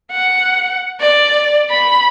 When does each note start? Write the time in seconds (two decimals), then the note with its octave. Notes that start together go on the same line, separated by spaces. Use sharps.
0.11 F#5
1.00 D5
1.70 B5